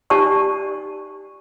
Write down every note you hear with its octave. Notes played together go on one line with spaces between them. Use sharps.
D#4 G4 D5 G#5 A5 C#6